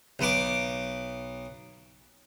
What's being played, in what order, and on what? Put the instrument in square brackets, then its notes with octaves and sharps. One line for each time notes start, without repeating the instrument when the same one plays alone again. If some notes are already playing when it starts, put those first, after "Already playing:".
[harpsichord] B1 B3 D6